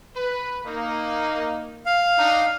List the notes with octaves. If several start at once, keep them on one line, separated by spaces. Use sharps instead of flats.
B4
A#3 D#4
F5
D4 D#4